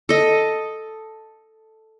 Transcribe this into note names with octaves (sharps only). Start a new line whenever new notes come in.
A4 D#5